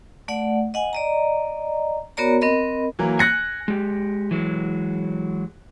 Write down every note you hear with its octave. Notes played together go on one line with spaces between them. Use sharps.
A3 D5 F#5
D#5 F#5 G#5
D5 D#5 A#5
B3 F#4 A#4 C#5 D5 A#5
C4 A#4 D#5 B5
E3 F#3 A#3
G#5 F#6 A#6 C#7
G#3 G4
E3 F#3 G#3